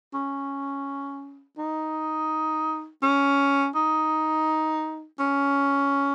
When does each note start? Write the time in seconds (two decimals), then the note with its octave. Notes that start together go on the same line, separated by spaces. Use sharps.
0.14 C#4
1.58 D#4
3.03 C#4
3.75 D#4
5.19 C#4